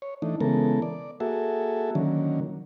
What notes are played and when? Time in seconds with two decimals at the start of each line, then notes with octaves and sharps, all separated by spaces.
0.02 C#5
0.22 E3 A3 D4 D#4
0.40 C#3 E3 G#3 B3 A4 A#4
0.82 D5
1.20 A#3 F#4 G#4 A4 E5
1.95 D3 D#3 F#3 A#3 C#4